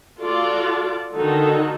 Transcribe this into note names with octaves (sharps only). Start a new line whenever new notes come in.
F4 F#4 A4 D5
D3 D#3 D#4 F#4 A4